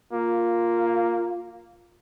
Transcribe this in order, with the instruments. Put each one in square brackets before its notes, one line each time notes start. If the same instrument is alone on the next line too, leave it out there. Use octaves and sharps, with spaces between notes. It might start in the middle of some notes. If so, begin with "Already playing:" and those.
[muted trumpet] A#3 [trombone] F4